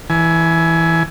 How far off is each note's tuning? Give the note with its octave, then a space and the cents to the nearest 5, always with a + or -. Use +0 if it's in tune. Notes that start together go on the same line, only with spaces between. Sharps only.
E3 -5 G#5 +20